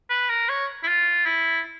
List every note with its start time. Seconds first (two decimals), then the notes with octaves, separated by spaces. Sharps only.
0.10 B4
0.29 A#4
0.49 C#5
0.83 E4
0.88 F4
1.26 E4